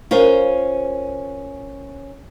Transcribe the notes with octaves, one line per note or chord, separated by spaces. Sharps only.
C#4 F4 A#4 C5